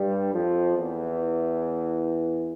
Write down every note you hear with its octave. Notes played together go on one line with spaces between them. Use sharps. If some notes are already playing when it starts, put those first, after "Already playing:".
Already playing: G2 G3
F2 F3
E2 E3